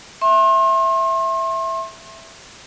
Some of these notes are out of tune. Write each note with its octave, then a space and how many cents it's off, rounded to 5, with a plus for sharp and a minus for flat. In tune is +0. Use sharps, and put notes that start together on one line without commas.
E5 +0 C6 +40